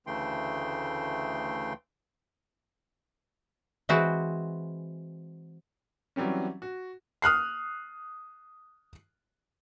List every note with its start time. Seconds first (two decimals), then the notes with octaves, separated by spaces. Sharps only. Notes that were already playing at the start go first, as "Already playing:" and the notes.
0.07 D2 C#3 E3 A3 G5 C6
3.89 E3 G#3 C4 E4 F#4 C5
6.16 E3 F#3 G3 C4 C#4
6.62 F#4
7.22 D#6 F6 F#6 C7